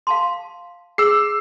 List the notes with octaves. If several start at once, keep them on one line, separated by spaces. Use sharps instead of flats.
F5 A5 C6
G#4 E6 C7